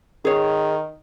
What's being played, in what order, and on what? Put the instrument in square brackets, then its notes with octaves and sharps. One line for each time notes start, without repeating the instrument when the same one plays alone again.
[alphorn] D#3 [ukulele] G#4 C#5